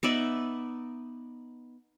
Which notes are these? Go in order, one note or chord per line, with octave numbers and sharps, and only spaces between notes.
B3 D#4 D5 E5